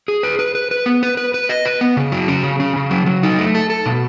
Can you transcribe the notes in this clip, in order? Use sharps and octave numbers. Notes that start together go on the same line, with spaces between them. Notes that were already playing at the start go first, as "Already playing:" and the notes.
G#4
B4
B4
B4
B4
B3
B4
B4
B4
D#5
B4
B3
C#3
F#3
C#4
C#3
C#4
C#3
F#3
F#3
D#4
A3
A4
A4
B2